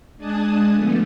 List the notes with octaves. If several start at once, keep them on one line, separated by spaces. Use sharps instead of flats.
G#3 D4 G#5 A5 D#6 F#6
D3 F3 A3 B3